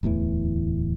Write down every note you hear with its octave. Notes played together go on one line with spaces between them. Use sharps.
D1 E2 A2 E3